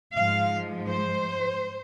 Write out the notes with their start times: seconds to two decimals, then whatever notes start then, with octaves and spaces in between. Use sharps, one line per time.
0.16 G#2 F3 G#3 F5
0.90 C5